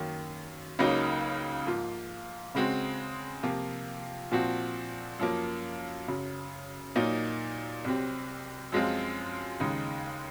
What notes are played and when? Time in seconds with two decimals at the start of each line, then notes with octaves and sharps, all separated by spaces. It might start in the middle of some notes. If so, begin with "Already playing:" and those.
Already playing: F#2 D#3 A#3
0.79 C#2 C#3 F#3 A#3 D#4
1.67 G#2 F3 A#3 F4
2.55 C#3 G#3 C4 F#4
3.43 C3 F3 A#3 F4
4.32 A#2 F3 C4 F#4
5.19 F#2 F3 A#3
6.08 F#2 C#3 F#3
6.96 A#2 F#3 A#3 D#4
7.84 C2 C3 F#3 C4
8.72 F#2 F3 G#3 C4 F4
9.60 D#2 C#3 G#3 D#4